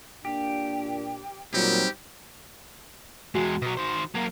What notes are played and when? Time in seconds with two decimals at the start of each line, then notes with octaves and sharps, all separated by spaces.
0.25 A#2 D4 G4
1.54 A#2 F#3 G3 C4 D#4 G4
3.35 E2 G#3 F#4
3.62 B2 F#3
3.77 D#3 C5
4.15 F#3 A#3